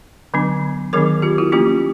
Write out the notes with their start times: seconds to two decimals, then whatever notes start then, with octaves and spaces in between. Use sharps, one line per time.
0.34 D3 F#3 B3 D4
0.93 D#3 F#3 B3 D4 G#4 A#4
1.22 F4 G4
1.38 E4 F#4
1.52 F3 A#3 C#4 F4 G4